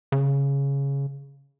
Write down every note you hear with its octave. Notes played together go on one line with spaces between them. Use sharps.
C#3